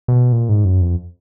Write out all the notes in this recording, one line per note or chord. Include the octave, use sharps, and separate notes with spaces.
B2
A#2
G#2
F#2
F2